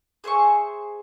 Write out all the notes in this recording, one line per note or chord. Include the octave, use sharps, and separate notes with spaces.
G#4 C5 E5 C#6